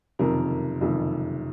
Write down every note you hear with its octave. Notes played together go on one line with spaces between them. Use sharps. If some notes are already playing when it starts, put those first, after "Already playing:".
F#1 F2 C3 D#3 A#4
F#1 F2 C3 D#3